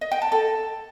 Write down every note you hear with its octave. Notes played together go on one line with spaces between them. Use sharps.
D#5
G5
A5
A4